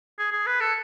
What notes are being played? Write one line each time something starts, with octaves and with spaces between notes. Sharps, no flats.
G#4
G#4
B4
A4